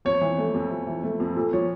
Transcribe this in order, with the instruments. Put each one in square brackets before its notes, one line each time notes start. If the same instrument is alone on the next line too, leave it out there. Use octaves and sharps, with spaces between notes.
[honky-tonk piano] F2 [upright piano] C#5
[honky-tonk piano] E3
A3
F2
F2
E3
A3
F2
[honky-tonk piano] A#2 [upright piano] A4
[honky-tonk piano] F3 [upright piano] C#5